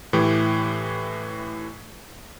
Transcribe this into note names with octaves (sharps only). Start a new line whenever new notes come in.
A2 E3 G4